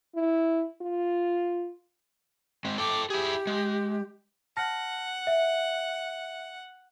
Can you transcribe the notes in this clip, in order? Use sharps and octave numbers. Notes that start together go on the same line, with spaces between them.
E4
F4
G#3 C4
A4 G5 C6 D6
E4 G4 G#4
G#3
F#5 A5 F6 A#6
E5